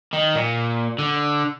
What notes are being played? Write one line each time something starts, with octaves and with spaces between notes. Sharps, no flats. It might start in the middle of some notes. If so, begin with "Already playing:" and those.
D#3
A#2
D3